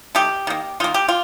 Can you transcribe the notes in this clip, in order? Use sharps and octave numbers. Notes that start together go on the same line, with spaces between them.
D#3 A3 G4
D#3 A#3
D#3 A#3 F4
G4
F4